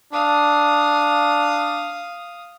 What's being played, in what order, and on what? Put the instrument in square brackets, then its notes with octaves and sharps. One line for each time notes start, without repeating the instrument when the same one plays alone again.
[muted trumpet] D4 [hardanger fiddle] F5 D#6